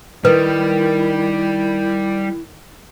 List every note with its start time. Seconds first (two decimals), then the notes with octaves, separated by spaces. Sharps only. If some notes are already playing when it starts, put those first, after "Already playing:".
0.25 D#3 G3 E4 B4